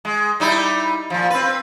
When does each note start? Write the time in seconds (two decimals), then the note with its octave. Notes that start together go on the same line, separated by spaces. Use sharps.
0.05 G#3
0.40 G3 D#4 E4
1.10 A#2 F3
1.30 C4 B4